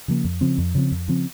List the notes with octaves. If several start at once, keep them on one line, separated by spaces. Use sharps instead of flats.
C#3 F3 A#3
F2
C#3 F3 C4
F2
C#3 F3 C4
F2
C#3 F3 C4